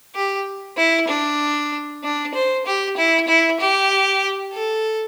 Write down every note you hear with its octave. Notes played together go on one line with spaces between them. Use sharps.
G4
E4
D4
D4
C5
G4
E4
E4
G4
A4